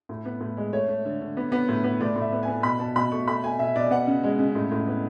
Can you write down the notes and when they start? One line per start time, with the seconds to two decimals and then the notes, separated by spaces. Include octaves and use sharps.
0.09 A2
0.25 B3
0.40 A2
0.57 G#3
0.73 A3 C#5
0.88 A3
1.05 D3
1.21 D3
1.37 B3
1.52 B3
1.68 A2
1.84 B3
2.01 A2 D5
2.16 A2
2.22 E5
2.32 B3
2.43 B3 G#5
2.63 B2 B5
2.79 B2 A5
2.96 B2 B5
3.12 A3 C#6
3.27 A3 B5
3.43 A3 G#5
3.59 B2 E5
3.76 B2 D5
3.91 B3 F#5
4.07 C#3
4.23 G#3
4.39 C#3
4.55 A2
4.71 A2
4.87 B3